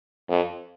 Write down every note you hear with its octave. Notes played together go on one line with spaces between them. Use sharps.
F2